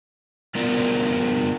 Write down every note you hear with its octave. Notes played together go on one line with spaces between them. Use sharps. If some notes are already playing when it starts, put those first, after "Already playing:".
G3 B3 F4 A#4 D5